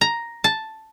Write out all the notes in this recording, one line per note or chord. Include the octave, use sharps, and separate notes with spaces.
A#5
A5